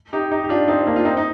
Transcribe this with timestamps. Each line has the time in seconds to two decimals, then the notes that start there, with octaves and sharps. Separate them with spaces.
0.13 D#4 G4
0.31 D#4 G4
0.44 G4
0.49 D4 F4
0.68 C4 D#4
0.86 A#3 D4
0.96 F4
1.05 C4 D#4
1.17 D#4